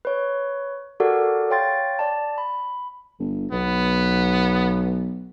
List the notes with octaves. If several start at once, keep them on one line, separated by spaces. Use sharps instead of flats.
B4 C#5
F#4 G4 A4 A#4 D5 F#5
C#5 F5 G5 C6 A6
D5 A5
B5
G1
B1 B3